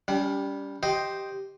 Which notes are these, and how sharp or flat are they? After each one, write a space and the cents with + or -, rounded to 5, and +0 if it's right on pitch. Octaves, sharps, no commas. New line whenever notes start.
G3 +0 C#4 +40
G4 -5 C5 +0 D#5 +0